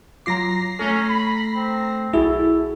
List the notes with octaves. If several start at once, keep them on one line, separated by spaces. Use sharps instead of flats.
F#3 F4 A#5 D6 A#6 C7
A3 C#4 A4
B5
C4
B1 E4 F#4 G#4 A4